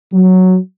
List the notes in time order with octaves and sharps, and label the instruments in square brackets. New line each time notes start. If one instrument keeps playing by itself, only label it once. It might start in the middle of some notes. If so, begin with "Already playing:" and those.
[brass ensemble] F#3